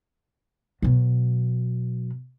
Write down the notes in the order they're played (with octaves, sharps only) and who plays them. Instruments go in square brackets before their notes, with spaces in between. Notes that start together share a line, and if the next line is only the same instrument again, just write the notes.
[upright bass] B2 F#3